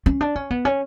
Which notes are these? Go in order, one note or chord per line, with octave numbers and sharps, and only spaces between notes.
C#4
D4
C#4
B3
C#4